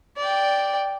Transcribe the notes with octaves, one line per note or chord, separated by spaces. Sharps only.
D5 G5